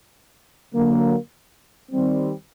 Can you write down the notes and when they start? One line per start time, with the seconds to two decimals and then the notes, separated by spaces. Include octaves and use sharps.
0.74 D3 F#3 A#3
1.92 D#3 G3 C4